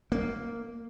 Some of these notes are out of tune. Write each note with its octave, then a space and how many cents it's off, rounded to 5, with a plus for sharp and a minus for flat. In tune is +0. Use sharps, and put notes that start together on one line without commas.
A#3 -5